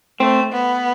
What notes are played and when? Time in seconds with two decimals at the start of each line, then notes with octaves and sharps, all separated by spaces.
0.20 A3 C4
0.52 B3